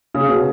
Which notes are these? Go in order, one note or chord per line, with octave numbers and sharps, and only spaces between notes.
C#3
B2